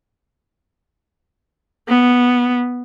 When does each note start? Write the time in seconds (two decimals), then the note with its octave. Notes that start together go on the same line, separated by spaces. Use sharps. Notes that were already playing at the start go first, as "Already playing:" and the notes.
1.88 B3